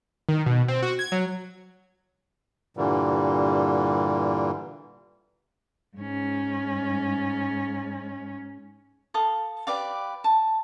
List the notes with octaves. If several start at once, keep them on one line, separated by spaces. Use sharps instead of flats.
D#3
B2
C4
F#4
G#6
F#3
G2 A#2 D3 E3 G3
G#2 C#4
A4 F5 D#6
G4 B4 D5 F5
A5